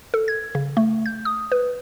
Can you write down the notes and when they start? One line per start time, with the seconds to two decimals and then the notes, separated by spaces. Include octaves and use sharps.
0.14 A4
0.28 G#6
0.55 C#3
0.77 A3
1.06 G6
1.25 D#6
1.52 B4